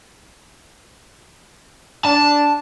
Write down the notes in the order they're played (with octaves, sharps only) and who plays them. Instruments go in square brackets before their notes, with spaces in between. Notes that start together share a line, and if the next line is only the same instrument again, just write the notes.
[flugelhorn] D4 [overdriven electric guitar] A5